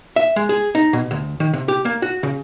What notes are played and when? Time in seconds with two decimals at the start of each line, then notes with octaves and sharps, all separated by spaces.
0.16 E5
0.36 G#3
0.49 G#4
0.75 D#4
0.93 B2
1.11 D2
1.40 D#3
1.53 C3
1.68 G4
1.85 A#3
2.02 F#4
2.23 C#3